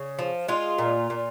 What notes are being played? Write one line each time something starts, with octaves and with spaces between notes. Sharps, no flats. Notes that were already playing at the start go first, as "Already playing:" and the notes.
Already playing: C#3
F3
G#3 F4
A#2
A#2